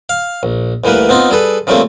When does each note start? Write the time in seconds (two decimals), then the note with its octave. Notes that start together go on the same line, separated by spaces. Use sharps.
0.09 F5
0.43 A#1
0.84 D2 E3 G3 A#3 B4
1.09 B3 C4 D#4 F4
1.30 G3 G#4 A4 B4
1.67 C#3 F3 G3 A3 A#3 C4